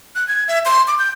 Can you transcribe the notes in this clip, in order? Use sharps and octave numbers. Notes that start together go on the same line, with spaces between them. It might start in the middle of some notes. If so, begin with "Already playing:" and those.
F#6
G#6
E5
C6
D6
G6